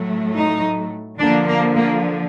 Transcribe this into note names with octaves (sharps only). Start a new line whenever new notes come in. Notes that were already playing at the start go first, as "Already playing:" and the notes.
Already playing: A2 F#3 A3
D#4
D3 F3 A#3 D4
A#3
A#3